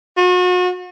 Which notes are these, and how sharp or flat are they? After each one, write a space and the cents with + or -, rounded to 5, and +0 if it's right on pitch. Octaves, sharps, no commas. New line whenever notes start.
F#4 -40